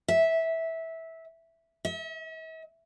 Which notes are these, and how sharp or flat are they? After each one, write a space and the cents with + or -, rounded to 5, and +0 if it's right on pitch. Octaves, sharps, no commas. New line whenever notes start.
E5 -15
E5 -45